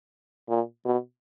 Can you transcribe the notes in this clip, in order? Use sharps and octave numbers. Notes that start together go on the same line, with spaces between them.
A#2
B2